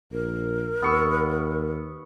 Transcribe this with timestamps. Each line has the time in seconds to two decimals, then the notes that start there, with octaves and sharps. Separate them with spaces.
0.12 A#1 A#4
0.82 D#2 B3 C#6 E6